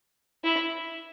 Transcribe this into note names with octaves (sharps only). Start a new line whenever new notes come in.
E4